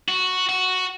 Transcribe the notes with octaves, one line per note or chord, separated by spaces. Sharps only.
F#4
F#4